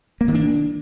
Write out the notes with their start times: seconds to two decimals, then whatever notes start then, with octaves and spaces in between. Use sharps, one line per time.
0.21 A#3
0.28 D#3
0.35 D4